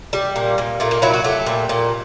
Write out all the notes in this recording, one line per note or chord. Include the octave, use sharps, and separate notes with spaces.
G3
A#2 A#3
A#2
A#2 A3
A#3
F#3 E4
F#4
A3 G4
A#2
A#2